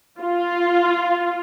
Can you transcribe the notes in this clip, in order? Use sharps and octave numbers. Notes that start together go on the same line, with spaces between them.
F4